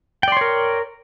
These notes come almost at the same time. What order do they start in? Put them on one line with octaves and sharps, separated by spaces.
G5 D5 C6 C#5 A#4